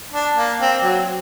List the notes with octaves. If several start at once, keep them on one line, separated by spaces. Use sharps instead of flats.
D4
A#3
C4
F#3